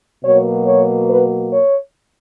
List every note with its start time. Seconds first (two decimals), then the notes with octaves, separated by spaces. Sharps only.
0.25 B2 F#3 A#3 C#5
0.67 C#5
1.08 B4
1.50 C#5